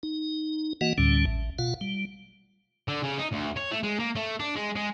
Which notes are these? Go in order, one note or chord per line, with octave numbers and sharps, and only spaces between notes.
D#4
E3 A#3 F#4 D#5 F#5
D2 A2 D3 G3 C#4
A1
B2 F4 F5 F#5
G3
D3
C#3
D#4
D2
C#5
A3
G#3
A#3
A3
D4
G#3
G#3